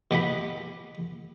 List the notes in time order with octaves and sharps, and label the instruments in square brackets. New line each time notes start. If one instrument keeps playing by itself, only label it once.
[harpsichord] B2 G4 F#5 B5